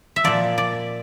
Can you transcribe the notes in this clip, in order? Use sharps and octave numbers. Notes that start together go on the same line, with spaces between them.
E5
A#2 F3 D5
D5